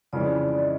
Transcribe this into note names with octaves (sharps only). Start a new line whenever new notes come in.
F2 C#3 E3 G#3 D5
D5
D#5